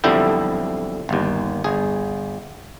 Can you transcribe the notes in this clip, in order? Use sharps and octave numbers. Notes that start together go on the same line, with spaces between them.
B1 F2 D3 G3 E4 G5
G1 D#2
G1 G#4